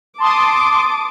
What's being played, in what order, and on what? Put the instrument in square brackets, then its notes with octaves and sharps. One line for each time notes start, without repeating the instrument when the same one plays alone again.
[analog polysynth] A5 C6 D#6 [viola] D6